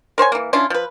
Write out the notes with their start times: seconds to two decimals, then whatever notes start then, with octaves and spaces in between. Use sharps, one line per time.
0.18 A#4 C5 C#5 G#5
0.32 E3 A#3
0.53 C#4 D4 E4 F4
0.70 F3 B4